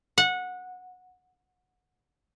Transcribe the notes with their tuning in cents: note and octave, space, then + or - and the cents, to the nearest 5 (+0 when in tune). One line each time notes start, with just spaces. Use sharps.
F#5 -20